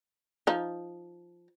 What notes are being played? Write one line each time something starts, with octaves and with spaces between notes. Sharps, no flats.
F3 D#4